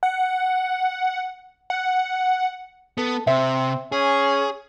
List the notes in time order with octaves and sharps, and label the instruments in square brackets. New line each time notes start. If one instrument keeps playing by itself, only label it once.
[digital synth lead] F#5
F#5
[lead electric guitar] B3 [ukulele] A4
[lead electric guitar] C3 [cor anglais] C4 [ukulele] E5
[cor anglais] C#4 [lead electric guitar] G#4